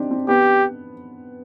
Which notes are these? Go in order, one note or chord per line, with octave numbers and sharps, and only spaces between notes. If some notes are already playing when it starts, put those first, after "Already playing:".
Already playing: C4 D4 D#4 G4
C4
B3 G4